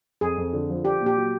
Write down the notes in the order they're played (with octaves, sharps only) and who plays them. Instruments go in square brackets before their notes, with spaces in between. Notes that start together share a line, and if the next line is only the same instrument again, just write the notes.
[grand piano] F2 [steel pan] G#4
[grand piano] F2
D3
F3
[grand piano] D4 [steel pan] G4
[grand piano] A#2
[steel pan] G4
[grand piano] F#3